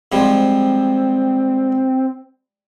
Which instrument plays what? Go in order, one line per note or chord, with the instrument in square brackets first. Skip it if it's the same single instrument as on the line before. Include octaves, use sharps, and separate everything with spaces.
[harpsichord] G#2 F3 G3 [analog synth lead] C4